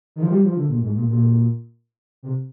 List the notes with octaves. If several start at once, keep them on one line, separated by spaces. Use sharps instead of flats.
D#3
F3
G3
F3
D3
A#2
G#2
A#2
A#2
C3